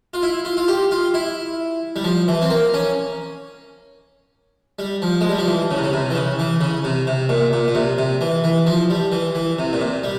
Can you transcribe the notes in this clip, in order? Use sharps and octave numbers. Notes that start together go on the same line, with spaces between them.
F4
E4
F4
F4
G4
F4
E4
G3
F3
E3
C4
A#3
C#4
G3
F3
G#3
G3
F3
E3
C#3
C3
C#3
C3
E3
C#3
E3
C#3
C3
C3
A#2
A#2
A#2
C3
C3
E3
E3
F3
G3
E3
E3
C3
A#2
C3
G3